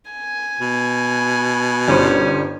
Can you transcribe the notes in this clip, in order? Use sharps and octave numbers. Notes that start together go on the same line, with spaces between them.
G#5
B2
G1 G3 C#4 C5